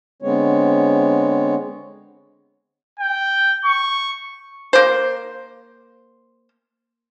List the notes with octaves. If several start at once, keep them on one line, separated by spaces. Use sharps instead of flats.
D3 G#3 B3 C4 C#5
G5
C#6
A#3 C5